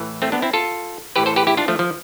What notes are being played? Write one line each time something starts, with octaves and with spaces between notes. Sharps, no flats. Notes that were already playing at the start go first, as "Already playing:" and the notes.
Already playing: A2 E3
A3 C4
B3 D4
C4 E4
F4 A4
A2 E3 G4 B4
A4 C5
G4 B4
E4 G4
D4 F4
F3 A3
F3